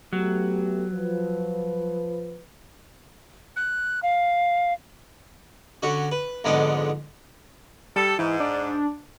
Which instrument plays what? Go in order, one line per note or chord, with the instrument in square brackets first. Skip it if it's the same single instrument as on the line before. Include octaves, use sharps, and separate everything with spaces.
[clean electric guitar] F#3 [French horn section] A3 B3 G4
[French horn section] F3 B4
[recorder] F#6
F5
[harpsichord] D3 C#4 F#4
B4
F2 G#2 D3 G#3 B3 D4
[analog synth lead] G3 [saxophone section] A4
[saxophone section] G#2 [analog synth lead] E3
[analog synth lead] D4